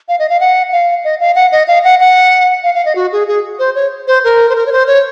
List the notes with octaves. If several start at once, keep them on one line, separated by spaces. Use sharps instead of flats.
F5
D#5
F5
F#5
F5
D#5
F5
F#5
D#5
F5
F#5
F#5
F5
F5
D#5
F#4
G#4
G#4
C5
C#5
C5
A#4
C5
A#4
C#5
C5
C#5